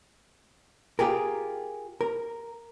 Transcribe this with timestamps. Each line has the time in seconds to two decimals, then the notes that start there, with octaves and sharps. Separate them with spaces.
0.99 F4 G4 G#4 A#4
2.01 A#4